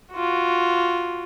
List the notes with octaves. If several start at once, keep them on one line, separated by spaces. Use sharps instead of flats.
F4 F#4